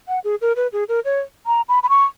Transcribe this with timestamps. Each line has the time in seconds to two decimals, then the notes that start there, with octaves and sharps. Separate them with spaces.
0.08 F#5
0.24 G#4
0.41 A#4
0.56 B4
0.73 G#4
0.89 A#4
1.05 C#5
1.47 A#5
1.69 B5
1.83 B5
1.89 C#6